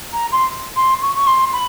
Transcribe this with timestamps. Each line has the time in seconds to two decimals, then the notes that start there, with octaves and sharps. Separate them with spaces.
0.13 A#5
0.32 C6
0.76 C6
1.02 C#6
1.15 C#6
1.27 C6
1.53 B5